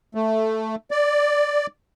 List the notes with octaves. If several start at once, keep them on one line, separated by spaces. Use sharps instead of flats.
A3
D5